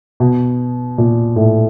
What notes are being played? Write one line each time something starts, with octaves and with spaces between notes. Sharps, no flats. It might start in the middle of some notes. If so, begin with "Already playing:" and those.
B2
A#2
A2